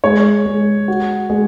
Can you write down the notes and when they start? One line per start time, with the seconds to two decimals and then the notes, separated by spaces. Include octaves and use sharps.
0.04 G#3 C#5
0.46 G#3
0.88 F#4
1.30 G#3